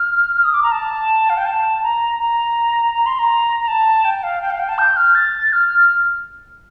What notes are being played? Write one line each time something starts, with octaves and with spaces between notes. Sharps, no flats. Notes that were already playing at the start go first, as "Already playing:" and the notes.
Already playing: F6
F6
D#6
D6
A#5
A5
F5
G5
A5
A#5
A#5
A#5
C6
A#5
A#5
A5
G5
F5
G5
F5
G5
A5
G6
F6
A6
F6